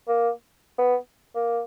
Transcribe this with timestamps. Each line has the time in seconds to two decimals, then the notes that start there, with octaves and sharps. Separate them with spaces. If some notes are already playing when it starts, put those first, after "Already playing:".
0.08 A#3
0.78 B3
1.35 A#3